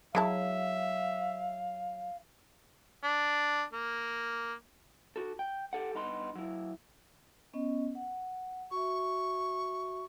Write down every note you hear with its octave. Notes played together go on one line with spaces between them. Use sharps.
F#3 G#3 E4 E5 F5 A5
D4
A#3
F#4 A4
G5
G4 A4 F#5
G2 B3 D#4 B4 C6
F#3 E4
B3 C#4 D#5
F#5
F#4 E5 C#6